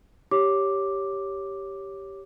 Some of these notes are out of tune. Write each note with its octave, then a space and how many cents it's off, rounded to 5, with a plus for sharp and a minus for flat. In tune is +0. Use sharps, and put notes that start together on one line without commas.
G4 +0 C#5 +0 D6 +0